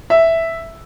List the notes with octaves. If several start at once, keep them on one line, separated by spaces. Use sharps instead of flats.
E5